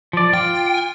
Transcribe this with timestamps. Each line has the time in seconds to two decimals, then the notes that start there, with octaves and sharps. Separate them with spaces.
0.13 F3 D5
0.34 F4 G5